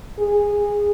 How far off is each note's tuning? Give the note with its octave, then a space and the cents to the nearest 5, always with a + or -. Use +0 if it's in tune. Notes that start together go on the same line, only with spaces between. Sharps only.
G#4 -15